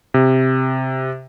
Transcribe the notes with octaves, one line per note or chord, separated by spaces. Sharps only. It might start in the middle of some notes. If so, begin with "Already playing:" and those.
C3